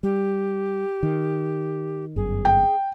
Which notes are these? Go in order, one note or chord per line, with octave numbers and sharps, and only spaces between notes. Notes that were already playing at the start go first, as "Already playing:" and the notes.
G3 G4
D#3
G1 F#2 G#4
G5